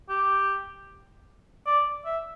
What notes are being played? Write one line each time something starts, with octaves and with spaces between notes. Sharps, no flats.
G4
D5
E5